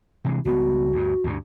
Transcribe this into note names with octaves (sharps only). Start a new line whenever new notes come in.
C3 E3 G#3
C#2 G3 B3 F#4
D2 G2
D2 G2